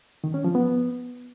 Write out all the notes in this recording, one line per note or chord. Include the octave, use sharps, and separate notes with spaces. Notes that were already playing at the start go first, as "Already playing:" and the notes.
D#3
C#4
F3
B3